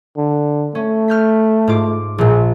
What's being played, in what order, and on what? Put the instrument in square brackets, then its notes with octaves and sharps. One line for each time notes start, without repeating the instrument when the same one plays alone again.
[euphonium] D3
[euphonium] A3 [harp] C#4
[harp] F6 G6 B6
G#2 F4 D6
[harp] A#1 A#2 [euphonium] G#4